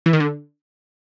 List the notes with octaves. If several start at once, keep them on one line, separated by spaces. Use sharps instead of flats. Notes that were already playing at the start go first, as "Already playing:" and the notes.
E3
D#3
D3